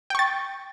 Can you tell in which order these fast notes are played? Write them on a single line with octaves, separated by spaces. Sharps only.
G5 C#6 A6